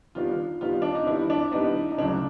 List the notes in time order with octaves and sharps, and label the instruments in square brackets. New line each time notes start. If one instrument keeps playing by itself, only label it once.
[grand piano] D#3 G3 B3 D4 [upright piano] F4
[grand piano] D#3 G3 B3 D4 [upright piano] F4
[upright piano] D4
D#4
[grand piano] D#3 G3 B3 D4 [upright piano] E4
[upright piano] D4
[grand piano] D#3 G3 B3 D4 [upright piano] D#4
[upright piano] D#4
[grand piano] D2 C#3 F#3 [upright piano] D4